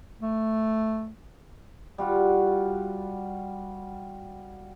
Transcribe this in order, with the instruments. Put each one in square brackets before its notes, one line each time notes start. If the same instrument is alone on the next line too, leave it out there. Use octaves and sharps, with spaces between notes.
[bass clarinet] A3
[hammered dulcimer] G3 F4 F#4